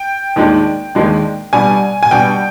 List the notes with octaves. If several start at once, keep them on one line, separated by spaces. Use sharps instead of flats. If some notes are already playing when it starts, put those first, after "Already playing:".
Already playing: G5
D#2 D#3 G#3 D4
D#2 D#3 G#3 D4
B2 G3 D4 G#5
G#5
B2 G3 D4 G5